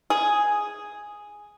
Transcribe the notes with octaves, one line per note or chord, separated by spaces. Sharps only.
G#4